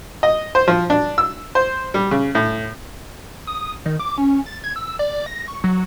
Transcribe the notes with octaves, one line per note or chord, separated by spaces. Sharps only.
D#5
C5
F3
D4
E6
C5
G3
C#3
A2
D#6
D#3
D6
C#4
A6
G#6
E6
D5
A#6
C#6
F#3